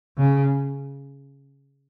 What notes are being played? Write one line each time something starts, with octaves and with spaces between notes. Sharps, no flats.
C#3